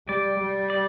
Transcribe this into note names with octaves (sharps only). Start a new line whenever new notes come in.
G3 D5
G3
D5